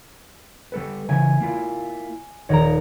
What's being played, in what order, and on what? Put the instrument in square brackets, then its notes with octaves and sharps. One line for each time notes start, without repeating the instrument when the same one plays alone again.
[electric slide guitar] G3 A4 B4
[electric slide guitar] C#3 E3 E5 [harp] G#5
[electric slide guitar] A#3 E4 F4
[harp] D#1 A#4 A#5 [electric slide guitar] C#5 D#5